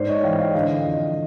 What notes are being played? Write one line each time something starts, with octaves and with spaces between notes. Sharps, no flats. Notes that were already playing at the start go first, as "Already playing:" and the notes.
Already playing: G#2 C5 D5
C#5 D#5
E3 F5 G5
F5 G5
D3 D#5 F5
F2